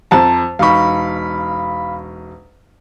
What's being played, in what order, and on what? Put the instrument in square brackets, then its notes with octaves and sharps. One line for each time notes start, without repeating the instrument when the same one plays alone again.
[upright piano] F2 C4 A#5 [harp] A5
[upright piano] E1 D#4 C#6 [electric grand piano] F5 B5